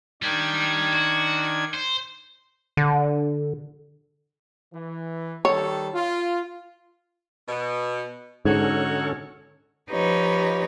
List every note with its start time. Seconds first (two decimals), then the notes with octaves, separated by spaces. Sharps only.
0.22 D#3 G3 D4 G#6
0.92 F#4
1.74 C5
2.77 D3
4.73 E3
5.45 D#3 G3 A4 C#5
5.94 F4
7.47 B2
8.45 G#2 D3 C#4 D#4 F#4 A4 C#5
9.91 F3 D#4 G4 B4 C#5